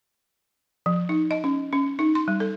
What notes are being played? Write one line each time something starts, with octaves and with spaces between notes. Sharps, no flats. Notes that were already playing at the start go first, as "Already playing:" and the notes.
F3
D#4
D#5
C#4
C#4
D#4
C6
G3
A4